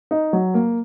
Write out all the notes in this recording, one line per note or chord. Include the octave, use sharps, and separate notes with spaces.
D#4
F#3
A#3